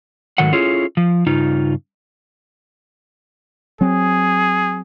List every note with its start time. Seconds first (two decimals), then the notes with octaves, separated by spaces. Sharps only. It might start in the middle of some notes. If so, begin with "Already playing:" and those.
0.38 G#2 D#3 F#3 A3 F#5
0.52 C#4 E4 F4 G#4 A4 C#5
0.97 F3
1.26 G2 C#3 D#4 F4
3.81 F#3 C4 G#4